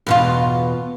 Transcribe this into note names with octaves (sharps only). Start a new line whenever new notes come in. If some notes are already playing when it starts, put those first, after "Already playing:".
E2 B2 F4